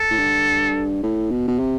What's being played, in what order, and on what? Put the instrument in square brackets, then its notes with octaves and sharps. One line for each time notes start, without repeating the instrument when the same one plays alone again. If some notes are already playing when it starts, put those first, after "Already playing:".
Already playing: [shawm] A4
[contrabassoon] A2
G2
A2
B2
B2
C3